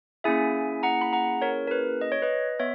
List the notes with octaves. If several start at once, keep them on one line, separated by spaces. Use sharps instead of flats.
A#3 C#4 E4 G#4 E5 G#5
F#5 A#5
B5
F#5 A#5
A#4 C#5
A#4
B4
D#5
C#5
B4 D#5
B3 C#5 E5